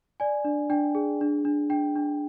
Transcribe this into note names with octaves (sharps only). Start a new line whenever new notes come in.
D5 G#5
D4
D4 G5
G#4
D4
D4
D4 G5
D4